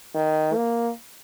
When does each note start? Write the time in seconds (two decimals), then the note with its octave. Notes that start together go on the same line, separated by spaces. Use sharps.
0.15 D#3
0.55 A#3